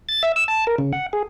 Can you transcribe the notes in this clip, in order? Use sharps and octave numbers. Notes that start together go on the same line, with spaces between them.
A6
E5
E6
A5
A#4
C#3
F#5
G#4